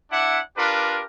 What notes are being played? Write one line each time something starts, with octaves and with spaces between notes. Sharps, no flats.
D4 E4 E5 F#5 D6
D4 F4 G4 A#4 B4